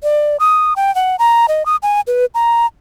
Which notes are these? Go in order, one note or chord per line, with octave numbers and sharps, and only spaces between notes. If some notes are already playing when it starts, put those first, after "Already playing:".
D5
D#6
G5
F#5
A#5
D#5
D#6
G#5
B4
A#5